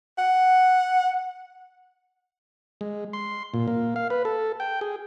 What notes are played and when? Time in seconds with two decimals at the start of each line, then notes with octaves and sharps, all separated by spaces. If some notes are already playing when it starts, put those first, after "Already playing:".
0.18 F#5
2.81 G#3
3.13 C6
3.54 A#2
3.68 A#3
3.96 F5
4.10 B4
4.25 A4
4.60 G5
4.81 G#4